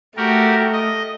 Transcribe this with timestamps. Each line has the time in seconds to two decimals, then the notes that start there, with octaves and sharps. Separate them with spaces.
0.17 A3 F#4 G4 A#4
0.72 D#5